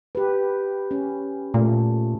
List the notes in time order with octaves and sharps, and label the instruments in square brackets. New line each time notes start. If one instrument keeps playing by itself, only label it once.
[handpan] G4 B4
C#4
[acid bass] A#2 [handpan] A3